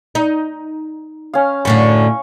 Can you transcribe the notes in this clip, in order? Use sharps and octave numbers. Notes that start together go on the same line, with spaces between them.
D#4
C#4 F5
F#2 A2 D3 C#6